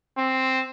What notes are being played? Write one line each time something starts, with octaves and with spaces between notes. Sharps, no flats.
C4